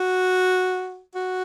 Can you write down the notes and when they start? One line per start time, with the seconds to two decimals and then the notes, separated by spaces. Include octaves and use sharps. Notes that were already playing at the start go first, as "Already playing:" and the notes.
Already playing: F#4
1.15 F#4